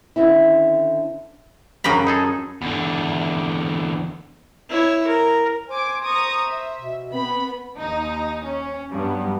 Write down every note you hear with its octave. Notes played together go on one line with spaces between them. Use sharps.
D3 D#3 C4 C#4 E4
F#2 C#3 G5 A#5 B5
D#4 G#4 A4
E2 D3
E4 C#5
A#4
C5 G#5 D6
A#5 C#6 D#6
E5
B2
B3 C4 B5
D#2 D#4
C#4
G2 F#3 G3 B3